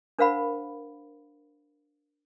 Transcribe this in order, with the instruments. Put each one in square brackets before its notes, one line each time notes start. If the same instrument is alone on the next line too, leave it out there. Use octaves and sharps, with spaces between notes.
[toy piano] D4 A#4 C5 F5 F#5 B5